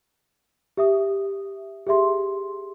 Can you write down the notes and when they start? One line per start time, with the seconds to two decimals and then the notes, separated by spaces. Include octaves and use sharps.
0.77 G4 E5 D#6
1.87 G4 G#4 E5 C6